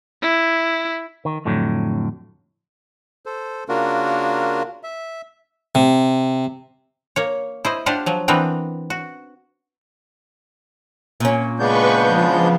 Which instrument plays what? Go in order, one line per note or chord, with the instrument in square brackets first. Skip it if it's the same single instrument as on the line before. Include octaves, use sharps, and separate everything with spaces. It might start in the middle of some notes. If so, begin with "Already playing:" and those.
[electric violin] E4
[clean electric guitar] D#3
F2 A2 D3 F#3
[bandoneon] A4 C5
C#3 A#3 D4 F4 F#4 A#4
E5
[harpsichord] C3
[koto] A#3 C#5
E4 C5 D#5
D4 F4 G4 C5 D5 F#5
F3 F#3
E3 B3 C4 D4 A#4 B4
F#4
[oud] A#2 C#4
[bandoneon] C#3 B3 [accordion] G#3 D4 G6 [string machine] B4 C#6
[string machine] F3